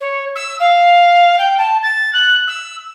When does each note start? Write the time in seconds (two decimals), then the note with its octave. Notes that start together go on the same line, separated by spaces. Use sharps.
0.01 C#5
0.35 E6
0.60 F5
1.39 G5
1.58 A5
1.83 A6
2.13 F#6
2.47 E6